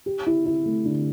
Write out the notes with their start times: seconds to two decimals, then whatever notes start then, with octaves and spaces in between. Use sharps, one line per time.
0.06 G4
0.27 E4
0.46 E4
0.66 A3
0.85 D3